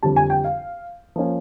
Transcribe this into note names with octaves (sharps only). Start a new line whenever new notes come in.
F2 D3 G3 A5
G#5
G5
F5
F3 A#3 C#4